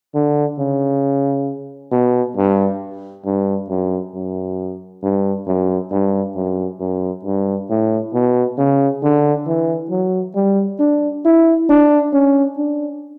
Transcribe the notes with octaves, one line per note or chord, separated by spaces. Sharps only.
D3
C#3
B2
G2
G2
F#2
F#2
G2
F#2
G2
F#2
F#2
G2
A2
B2
C#3
D3
E3
F#3
G3
D4
E4
D4
C#4
D4